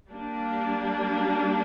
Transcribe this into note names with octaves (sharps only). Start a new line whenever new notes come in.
G3 A#3 D4